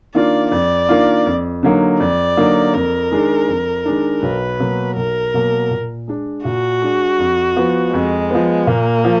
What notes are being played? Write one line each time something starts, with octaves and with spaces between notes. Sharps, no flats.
D#3 A#3 D4 F4 D5
F2 D5
D#3 A#3 D4 F4
F2
D3 F#3 A#3 D#4
F2 D5
D3 F#3 A#3 D#4
F2 A#4
D#3 G#3 D4
F2
D#3 G#3 D4
B1 B4
B2 F#3 A#3
B1 A#4
B2 F#3 A#3
A#2
G#3 D4
A#2 F#4
G#3 D4
F2
F3 B3
F2 G#3
F3 B3
A#2 A#3
F3